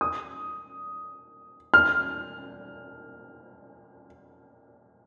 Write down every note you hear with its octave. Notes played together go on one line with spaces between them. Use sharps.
D#6
F6